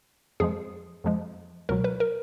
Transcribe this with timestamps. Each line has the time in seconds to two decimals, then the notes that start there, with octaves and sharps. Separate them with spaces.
0.40 F2 F3 G#3 G#4
1.04 F2 F3 G#3
1.69 C#2 B2 F#3 A#4
1.84 B4
2.00 A#4